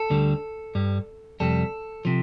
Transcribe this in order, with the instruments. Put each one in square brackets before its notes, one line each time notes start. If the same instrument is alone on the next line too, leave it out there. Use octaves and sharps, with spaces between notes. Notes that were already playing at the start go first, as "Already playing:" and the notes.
Already playing: [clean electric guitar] A4
D2 D3 G3
G2 G3
F2 C3 G3 A4
C3 F3